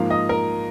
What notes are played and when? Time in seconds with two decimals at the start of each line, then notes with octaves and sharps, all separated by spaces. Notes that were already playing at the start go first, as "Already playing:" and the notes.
Already playing: G#2 F3 A#3 F5
0.10 D#5
0.29 A#4